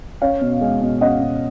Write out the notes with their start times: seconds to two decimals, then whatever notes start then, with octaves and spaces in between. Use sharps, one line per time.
0.22 C#4 C#5 F5
0.41 B2
0.61 G#3
0.81 B2
1.01 C#4 D#5 F#5
1.21 B2